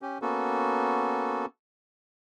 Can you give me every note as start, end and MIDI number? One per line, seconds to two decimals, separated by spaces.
0.02 0.18 61
0.02 0.18 67
0.22 1.46 58
0.22 1.46 59
0.22 1.46 61
0.22 1.46 66
0.22 1.46 69